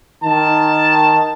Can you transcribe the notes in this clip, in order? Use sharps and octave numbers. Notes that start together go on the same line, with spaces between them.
D#3 A5